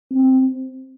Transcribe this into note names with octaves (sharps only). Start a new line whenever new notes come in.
C4